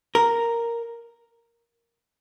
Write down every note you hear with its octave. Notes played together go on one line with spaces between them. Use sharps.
A#4